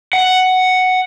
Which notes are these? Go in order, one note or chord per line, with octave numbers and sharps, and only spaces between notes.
F#5